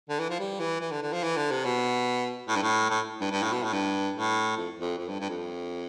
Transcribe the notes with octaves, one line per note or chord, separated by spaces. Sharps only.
D3
E3
F3
G3
E3
E3
D3
D3
F3
E3
D3
C3
B2
A2
G2
A2
A2
G2
G2
A2
B2
A2
G2
A2
F2
F2
F2
G2
G2
F2